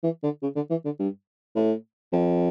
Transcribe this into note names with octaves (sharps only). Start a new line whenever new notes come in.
E3
D3
C#3
D3
E3
D3
G2
A2
F2